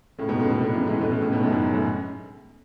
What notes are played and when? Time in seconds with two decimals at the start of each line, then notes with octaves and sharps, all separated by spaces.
0.18 A2 C#3
0.29 G#2 B2
0.39 A2 C#3
0.50 B2 D3
0.60 B2 D3
0.74 C#3 E3
0.87 E3 G#3
1.01 B2 D3
1.11 A2 C#3
1.22 A2 C#3
1.32 G#2 B2
1.42 F#2 A2
1.53 G#2
1.64 G#2
1.73 F#2 A2